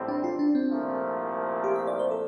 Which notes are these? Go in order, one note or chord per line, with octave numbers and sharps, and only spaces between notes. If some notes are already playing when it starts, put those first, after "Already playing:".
Already playing: A1 A2 G3 C4
D4
F4
D4
C4
C2 A#2 F3 A3
G4
E5
D5
C5
A4